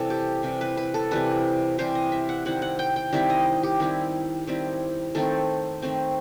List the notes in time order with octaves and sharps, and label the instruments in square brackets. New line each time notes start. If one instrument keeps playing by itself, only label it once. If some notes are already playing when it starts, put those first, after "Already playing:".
Already playing: [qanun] C3 E3 G3 A4
G4
C3 E3 G3
B4
B4
A4
C3 E3 G3 B4
C3 E3 G3 C5
D#5
E5
F#5
D#3 G3 C4 E4 F#5
F#5
G5
G5
D#3 G3 C4 E4 E5
D#5
G4
D#3 G3 C4 E4
D#3 G3 C4 E4
D#3 A3 C4 A4
D#3 A3 C4